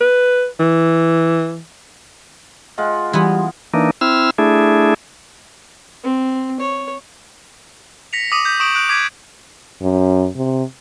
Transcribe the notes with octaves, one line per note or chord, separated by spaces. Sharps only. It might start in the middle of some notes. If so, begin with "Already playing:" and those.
B4
E3
G#3 F4 F#5
E3 G3 B3
E3 A#3 D4 D#4
C4 E4 E6 F6
A3 D4 E4 G#4
C4
C#5
A#6 B6 C#7 F7
D6 D#6 D#7
D6 G6 B6
C#6 D#6 D7 F#7
D#6 F#6 G6 D7
D6 G#6 B6 D#7
F#2
C3